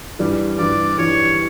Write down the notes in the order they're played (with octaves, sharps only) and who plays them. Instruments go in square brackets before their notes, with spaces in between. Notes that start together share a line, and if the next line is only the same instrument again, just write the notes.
[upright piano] G2 E3 G3
[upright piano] G2 E3 G3 [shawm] D5
[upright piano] G2 E3 G3 [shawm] C#5